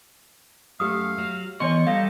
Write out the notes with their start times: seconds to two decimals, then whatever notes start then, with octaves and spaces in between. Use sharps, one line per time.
0.80 F#2 A3 G4 F5 D#6
1.18 F#3
1.60 E3 B3 C#5 D#5 G#5 C6 C#6
1.87 G3 D#4 A4 F5